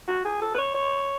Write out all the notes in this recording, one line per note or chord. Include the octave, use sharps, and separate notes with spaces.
F#4
G#4
A4
B4
C#5
C#5